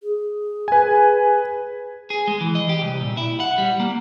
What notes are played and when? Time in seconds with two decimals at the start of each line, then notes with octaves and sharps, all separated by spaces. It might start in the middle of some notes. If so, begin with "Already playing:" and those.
0.03 G#4
0.68 B4 G#5
2.10 G#4
2.28 G#3
2.41 E3
2.55 D#5
2.69 G4
2.82 C2
3.01 A#2
3.17 E4
3.40 F#5
3.58 G3
3.80 A#3